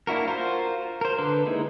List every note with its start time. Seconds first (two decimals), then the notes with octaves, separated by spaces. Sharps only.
0.07 A#3 D4 E4 F#4 A#4
0.27 F4 F#4 A#4 C5
1.01 A#4 C5
1.18 D3 D4 B4 C6
1.46 G#3 A#3 D#4 E4 G#4